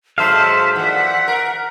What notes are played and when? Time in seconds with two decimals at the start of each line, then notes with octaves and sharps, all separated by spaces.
0.18 G#2 F#3 A4 C5 E5 F5 A5 B6
0.76 A#2 E3 F#5
1.28 A#4